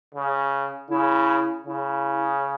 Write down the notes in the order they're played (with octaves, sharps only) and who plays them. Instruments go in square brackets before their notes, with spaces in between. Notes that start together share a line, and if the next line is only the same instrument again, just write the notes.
[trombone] C#3
[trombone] C#3 [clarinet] E4
[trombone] C#3 [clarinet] E4